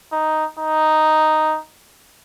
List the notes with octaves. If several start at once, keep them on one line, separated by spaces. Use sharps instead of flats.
D#4
D#4